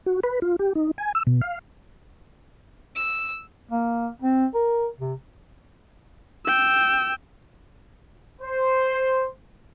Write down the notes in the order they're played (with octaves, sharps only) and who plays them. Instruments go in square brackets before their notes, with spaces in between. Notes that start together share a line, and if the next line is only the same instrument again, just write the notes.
[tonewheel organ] F#4
B4
F4
G4
D#4
G#5
E6
B2
F5
[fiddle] E6
[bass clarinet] A#3
C4
A#4
C3
[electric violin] G5 E6
[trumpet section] C5